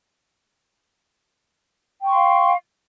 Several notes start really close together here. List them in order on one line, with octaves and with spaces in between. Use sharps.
G5 C#6 C6 F5